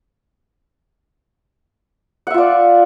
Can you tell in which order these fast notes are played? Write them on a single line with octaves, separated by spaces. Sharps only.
F#5 E5 F4 D5